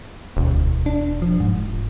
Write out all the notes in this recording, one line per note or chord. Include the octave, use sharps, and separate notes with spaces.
E1 D2
D4
F3
G#2